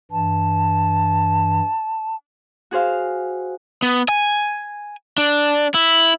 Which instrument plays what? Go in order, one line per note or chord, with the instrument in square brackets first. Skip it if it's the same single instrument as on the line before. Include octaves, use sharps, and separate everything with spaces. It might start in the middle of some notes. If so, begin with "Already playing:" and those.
[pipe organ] G2 E3 [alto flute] A5
[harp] F#4 G#4 C5 F5
[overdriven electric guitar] B3
G#5
D4
E4